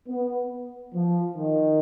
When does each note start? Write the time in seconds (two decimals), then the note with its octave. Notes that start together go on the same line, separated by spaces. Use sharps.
0.09 B3
0.94 F3
1.37 D#3